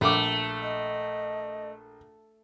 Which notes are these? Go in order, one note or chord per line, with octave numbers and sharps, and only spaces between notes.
A#1 A3 D6
D#5